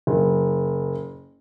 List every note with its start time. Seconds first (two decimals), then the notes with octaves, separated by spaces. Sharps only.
0.07 F#1